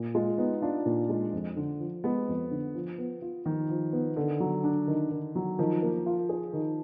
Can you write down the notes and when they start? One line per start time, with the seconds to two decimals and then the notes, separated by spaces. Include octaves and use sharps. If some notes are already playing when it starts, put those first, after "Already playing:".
Already playing: A#2
0.15 G#3 F4
0.38 B3 D#4
0.62 D4 F4
0.86 A#2
1.09 G#3
1.33 F2
1.57 D3
1.80 F3
2.04 G#3 B3
2.28 F2
2.51 D3
2.75 F3
2.98 B3
3.22 F4
3.46 D#3 F3
3.69 F3
3.93 B3
4.16 D3 D#3
4.40 F#3
4.64 D4
4.87 D#3
5.11 D#3
5.35 F#3
5.59 D#3 F3
5.82 A#3
6.06 F4
6.29 G#4
6.53 D#3